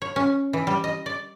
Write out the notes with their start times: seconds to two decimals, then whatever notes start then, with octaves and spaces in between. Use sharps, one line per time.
0.02 C#5
0.16 C#4
0.53 E3
0.67 G3
0.84 D#5
1.06 D5